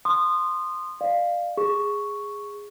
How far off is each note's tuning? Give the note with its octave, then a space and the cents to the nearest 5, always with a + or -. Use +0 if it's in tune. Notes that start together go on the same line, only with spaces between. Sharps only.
C6 +0 D#6 -25
D5 +35 F5 +0
G#4 -10 C#6 +0